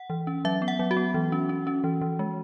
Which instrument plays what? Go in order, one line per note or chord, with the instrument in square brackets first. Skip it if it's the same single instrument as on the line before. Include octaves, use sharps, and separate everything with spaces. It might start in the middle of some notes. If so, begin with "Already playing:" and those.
Already playing: [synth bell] F#5
E3
C#4
F#3 E5
B3
F#5
F#3
F#4
B3
E3
C#4
C#4
C#4
E3
E3
G#3